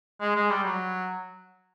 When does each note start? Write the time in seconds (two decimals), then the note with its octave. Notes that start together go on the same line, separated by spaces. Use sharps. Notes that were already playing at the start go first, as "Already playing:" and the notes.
0.21 G#3
0.36 G#3
0.51 G3
0.64 F#3